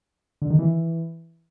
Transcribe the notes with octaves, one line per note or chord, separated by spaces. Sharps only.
D3
D#3
E3